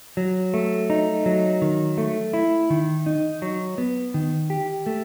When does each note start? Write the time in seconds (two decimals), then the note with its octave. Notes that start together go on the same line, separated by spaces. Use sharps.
0.17 F#3
0.54 A3
0.90 D#4
1.26 F#3
1.62 D#3
1.98 A3
2.34 E4
2.70 D#3
3.06 D#4
3.42 F#3
3.78 B3
4.14 D#3
4.50 G4
4.86 A3